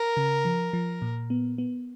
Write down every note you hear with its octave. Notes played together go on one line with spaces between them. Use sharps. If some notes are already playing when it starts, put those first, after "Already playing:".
Already playing: A#4
C#3
F3
F3
A#2
B3
B3